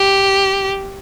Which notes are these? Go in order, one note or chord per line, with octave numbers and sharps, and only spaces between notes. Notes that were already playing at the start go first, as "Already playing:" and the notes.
Already playing: G4